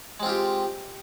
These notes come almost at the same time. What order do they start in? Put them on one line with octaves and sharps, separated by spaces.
G#3 C4 F4 G4